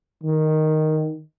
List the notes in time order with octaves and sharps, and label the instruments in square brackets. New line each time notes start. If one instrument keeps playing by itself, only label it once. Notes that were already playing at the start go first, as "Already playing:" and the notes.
[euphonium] D#3